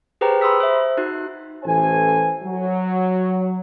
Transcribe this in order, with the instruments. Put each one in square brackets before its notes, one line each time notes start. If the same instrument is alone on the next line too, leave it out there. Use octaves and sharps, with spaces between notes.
[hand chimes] G4 G#4 B4 C5 G5 A#5
B5 C6 D#6 E6 B6
C5 E5
D#4 F#4 F#6
[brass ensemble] A1 E3 A4 C5 G#5
F#3